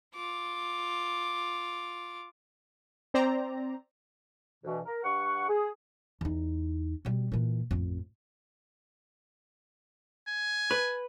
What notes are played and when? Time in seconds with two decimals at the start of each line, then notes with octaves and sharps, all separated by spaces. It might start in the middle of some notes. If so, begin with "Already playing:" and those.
0.15 F4 D6
3.14 C4 C5 D5 A#5
4.64 D2 B2 E3
4.86 A#4
5.04 G2 F#5 C#6
5.49 G#4
6.21 E2 D#4
7.05 B2 G3
7.32 A#2 E3
7.71 A1 F2
10.27 G#5
10.71 B4